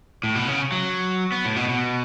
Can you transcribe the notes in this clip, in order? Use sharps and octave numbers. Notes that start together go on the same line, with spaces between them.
A2
B2
C#3
F#3
B3
A2
B2
B2